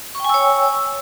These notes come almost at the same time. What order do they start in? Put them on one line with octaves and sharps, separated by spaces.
C#6 G5 G#5 E6 C#5